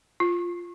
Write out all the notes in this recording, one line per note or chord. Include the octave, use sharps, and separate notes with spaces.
F4